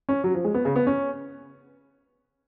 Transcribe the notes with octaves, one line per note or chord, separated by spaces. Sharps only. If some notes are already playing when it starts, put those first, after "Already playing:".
C#4
F#3
F3
G#3
B3
C#3
B3
C#4